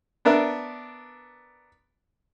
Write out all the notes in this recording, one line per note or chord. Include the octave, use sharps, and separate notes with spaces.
B3 D4 A#4 E5